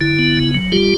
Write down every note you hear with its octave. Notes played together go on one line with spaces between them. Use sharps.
D3 E4
B3
C#3
F#3
G3 F4 G4